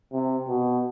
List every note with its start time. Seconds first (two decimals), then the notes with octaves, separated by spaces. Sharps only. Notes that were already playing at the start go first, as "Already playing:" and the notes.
0.13 C3
0.49 B2